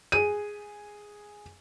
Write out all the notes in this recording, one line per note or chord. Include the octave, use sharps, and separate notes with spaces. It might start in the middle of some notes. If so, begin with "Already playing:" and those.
G#4 D#7